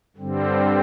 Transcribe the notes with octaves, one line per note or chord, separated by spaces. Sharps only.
G2 D3 G3 C4